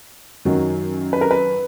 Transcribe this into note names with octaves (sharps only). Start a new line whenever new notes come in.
F#2 D#3 F#3
B4
A#4
B4